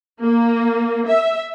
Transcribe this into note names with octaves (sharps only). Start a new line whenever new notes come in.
A#3
E5